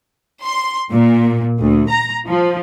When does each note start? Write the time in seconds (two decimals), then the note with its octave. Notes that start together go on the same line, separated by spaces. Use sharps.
0.44 C6
0.90 A#2
1.60 D2
1.90 A#5
2.26 F3